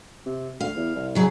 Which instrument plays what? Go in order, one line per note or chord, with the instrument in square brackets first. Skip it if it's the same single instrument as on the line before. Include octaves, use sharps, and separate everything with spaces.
[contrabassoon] C3
[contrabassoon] D2 [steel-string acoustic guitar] F5
[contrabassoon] E2
C2
[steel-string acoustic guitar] C#3 F#3 G#4